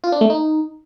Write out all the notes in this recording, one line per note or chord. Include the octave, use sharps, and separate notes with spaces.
F4
D4
A3
D#4